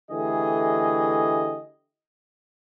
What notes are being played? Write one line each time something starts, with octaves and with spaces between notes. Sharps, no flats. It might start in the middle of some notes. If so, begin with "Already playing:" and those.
D3 E3 A3 G4 G#4 D#5